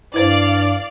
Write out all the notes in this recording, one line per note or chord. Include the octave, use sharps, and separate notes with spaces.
G2 E4 B4 C5 D5 F5